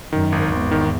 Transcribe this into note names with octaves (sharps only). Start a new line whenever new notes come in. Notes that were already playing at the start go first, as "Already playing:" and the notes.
F#2 D#3
G#1
G#1 E2 G#2
D#3